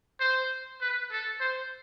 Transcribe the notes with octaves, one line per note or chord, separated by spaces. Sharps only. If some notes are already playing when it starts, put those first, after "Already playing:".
C5
B4
A4
C5